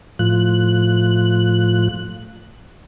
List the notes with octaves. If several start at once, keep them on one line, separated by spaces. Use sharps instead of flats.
A2 F3 F#6